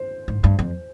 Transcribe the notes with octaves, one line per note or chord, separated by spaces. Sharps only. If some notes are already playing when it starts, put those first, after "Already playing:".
Already playing: C5
G#2
G2
F2